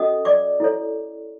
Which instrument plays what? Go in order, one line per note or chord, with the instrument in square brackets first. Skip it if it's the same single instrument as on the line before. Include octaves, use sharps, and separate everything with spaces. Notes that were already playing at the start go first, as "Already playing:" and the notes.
Already playing: [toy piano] C#4 F#4 A4 D#5 D#6
D5 D6
E4 A4 C#5